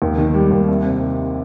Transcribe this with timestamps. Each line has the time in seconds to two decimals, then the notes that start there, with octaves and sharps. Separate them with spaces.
0.02 D#2
0.18 D#3
0.34 G3
0.51 D#2
0.68 C2
0.84 C3